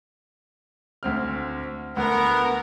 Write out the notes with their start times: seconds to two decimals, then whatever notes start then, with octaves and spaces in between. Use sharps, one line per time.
1.03 D2 C4 F6
1.96 D2 B3 A#4